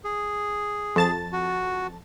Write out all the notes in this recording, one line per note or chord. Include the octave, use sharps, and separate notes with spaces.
G#4
F2 A5 A6
F#4